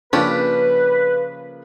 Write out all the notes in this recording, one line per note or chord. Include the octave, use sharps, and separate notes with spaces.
C#3 F3 A#3 C#4 D4 G4 B4